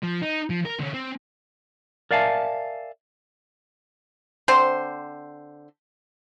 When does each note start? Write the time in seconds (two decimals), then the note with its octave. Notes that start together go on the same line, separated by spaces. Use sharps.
0.03 F3
0.22 D#4
0.50 F3
0.65 A#4
0.80 D3 C#4
0.94 C4
2.11 A#4 D5 E5 F5 G#5 A5
4.48 D3 C4 C5